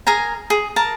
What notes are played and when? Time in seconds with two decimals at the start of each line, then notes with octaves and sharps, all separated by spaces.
0.07 G#4 A#4 G#5 A#5
0.50 G#4
0.76 A#4 A5 A#5